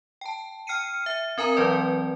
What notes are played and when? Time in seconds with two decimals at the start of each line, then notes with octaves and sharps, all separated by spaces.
0.21 G5 A5
0.67 G5 F6 C7 C#7 D#7
1.06 E5
1.38 C4 A#4 G#5 A#5
1.57 E3 F#3 C4 B4 D5